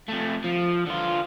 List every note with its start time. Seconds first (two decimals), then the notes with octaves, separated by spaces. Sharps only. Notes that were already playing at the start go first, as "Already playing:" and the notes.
0.09 F2 A3
0.44 F3
0.86 D3 F4